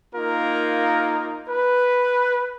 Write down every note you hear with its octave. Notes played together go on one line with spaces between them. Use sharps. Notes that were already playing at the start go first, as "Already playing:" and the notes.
A#3 D#4 F4 A#4
B4